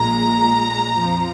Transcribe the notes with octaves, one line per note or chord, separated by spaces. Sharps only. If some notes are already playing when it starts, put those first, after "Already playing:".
Already playing: A#1 A#2 G#3 A#5
F2 F3